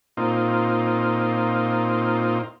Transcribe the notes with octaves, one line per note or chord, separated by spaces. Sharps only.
A#2 C4 D#4 F4